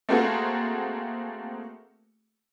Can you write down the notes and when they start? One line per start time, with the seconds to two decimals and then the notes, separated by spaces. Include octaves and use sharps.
0.09 A3 A#3 C4 F#4 G#4 A4